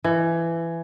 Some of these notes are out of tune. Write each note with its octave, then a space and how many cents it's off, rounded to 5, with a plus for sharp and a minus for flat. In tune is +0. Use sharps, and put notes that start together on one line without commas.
E3 +20